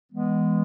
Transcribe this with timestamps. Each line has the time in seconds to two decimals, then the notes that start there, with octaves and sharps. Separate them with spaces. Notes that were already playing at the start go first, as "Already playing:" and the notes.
0.12 E3 G#3 B3